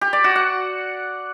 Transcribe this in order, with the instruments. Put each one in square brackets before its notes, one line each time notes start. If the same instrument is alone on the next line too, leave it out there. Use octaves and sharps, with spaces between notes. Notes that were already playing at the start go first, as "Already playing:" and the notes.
[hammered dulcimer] G4
D5
F#4
F#5